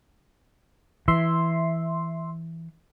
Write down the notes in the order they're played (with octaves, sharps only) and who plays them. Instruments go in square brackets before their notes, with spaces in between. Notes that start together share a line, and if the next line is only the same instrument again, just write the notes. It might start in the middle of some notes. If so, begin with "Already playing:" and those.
[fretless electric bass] E3 [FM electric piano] E5 C6